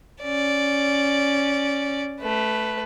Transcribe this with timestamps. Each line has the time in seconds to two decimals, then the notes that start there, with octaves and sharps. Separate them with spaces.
0.22 C#4 D5
2.21 A3 B4